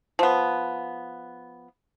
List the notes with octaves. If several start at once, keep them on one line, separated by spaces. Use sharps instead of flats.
F3 B3